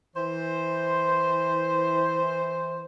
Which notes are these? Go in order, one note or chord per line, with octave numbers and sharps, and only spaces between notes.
E3 C5